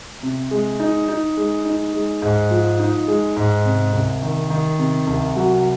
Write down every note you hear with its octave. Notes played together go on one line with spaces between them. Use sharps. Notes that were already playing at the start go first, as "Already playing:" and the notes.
C3
G#3
D#4
D#4
G#3
D#4
G#3
G#2
F3
D#4
G#3
G#2
C3
C2
D#3
D#3
C3
C2
F#3